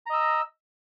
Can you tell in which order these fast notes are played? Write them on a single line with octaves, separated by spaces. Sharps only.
A#5 D#5 E6